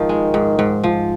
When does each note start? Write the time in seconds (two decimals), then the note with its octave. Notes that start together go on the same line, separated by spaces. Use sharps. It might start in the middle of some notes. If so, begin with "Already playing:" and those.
Already playing: G#2 D#3 F3
0.09 G#3
0.34 G#2
0.59 G#2
0.84 F3